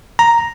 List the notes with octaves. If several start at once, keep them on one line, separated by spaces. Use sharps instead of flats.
A#5